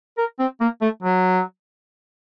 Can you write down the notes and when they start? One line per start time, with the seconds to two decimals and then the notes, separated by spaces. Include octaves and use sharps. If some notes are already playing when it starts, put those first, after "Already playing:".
0.17 A#4
0.39 C4
0.60 A#3
0.81 A3
1.02 F#3